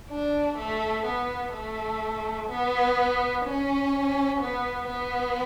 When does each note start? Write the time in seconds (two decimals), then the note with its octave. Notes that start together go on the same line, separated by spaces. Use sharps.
0.10 D4
0.57 A3
1.06 B3
1.53 A3
2.49 B3
3.45 C#4
4.40 B3
4.87 B3